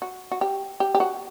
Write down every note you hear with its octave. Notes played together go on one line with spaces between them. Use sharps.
F#4
F#4
G4
G4
G4
F#4